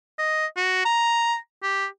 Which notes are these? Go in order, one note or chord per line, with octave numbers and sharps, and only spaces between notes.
D#5
F#4
A#5
G4